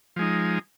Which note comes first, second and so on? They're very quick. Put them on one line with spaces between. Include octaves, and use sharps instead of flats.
F3 G#3 D#4